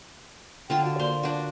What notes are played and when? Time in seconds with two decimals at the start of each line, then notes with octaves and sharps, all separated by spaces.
0.70 D3 F4 G5 A5
0.85 F#4
0.99 A#3 C5 D5 C6
1.23 D4 F#4